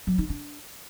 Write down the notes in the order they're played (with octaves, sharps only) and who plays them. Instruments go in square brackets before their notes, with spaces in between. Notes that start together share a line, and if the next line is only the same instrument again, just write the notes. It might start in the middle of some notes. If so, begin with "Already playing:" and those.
[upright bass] F#3
D#4
D4